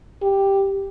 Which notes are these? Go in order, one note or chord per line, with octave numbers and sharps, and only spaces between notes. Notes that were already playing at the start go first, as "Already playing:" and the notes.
G4